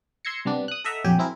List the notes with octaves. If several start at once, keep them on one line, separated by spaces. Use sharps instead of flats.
C6 E6 G#6 A#6 C#7
C3 G3 B3 D4
D#6 F#6
A4 D#5 E5 F#5 A#5
A#1 F2 F#3 G4 G5 G#5
F#3 C4 E4 G#4 A#4